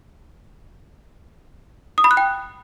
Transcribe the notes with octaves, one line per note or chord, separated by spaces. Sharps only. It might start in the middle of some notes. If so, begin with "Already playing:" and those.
D#6
B5
F#6
G5